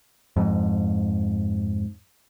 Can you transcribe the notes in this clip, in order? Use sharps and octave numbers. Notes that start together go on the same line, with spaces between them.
F2 G#2